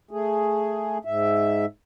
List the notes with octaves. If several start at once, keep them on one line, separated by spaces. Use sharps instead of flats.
A3 G#4
G#2 E5